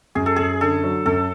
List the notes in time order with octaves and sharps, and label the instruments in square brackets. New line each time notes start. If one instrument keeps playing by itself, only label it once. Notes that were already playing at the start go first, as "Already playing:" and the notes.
[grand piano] F#2 [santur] G#4
[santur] A4
[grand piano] F#2 [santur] G#4
[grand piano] D3 [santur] A4
[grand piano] F#3
[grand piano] F#2 [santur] A4